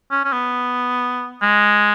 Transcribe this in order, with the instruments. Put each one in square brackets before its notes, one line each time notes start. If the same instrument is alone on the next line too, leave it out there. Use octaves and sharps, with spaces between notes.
[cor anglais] C#4
C#4
B3
G#3